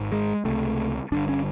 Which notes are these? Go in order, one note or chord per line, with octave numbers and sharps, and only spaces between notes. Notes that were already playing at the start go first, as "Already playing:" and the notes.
Already playing: G#1 G#2
G#3
C#2 C3 A3
G1 G2 D3 D4
C#4